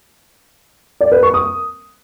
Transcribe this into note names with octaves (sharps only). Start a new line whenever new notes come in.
D5
B4
C#6
D#6